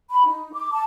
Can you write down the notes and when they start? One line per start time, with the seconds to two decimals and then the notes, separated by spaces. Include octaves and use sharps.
0.10 B5
0.26 D#4
0.53 D6
0.73 A5